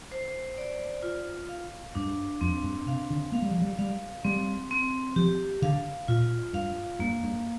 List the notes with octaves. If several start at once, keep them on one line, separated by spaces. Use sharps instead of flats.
C5
D5
F4
F5
G2 D4
F2 C4
G2
C3 F5
D3
A#3 F5
G3
F3
G3
G3 F5
G3 C4
C4
F3 G4
D3 F5
A#2 F4
G2 F5
G2 A#3
G2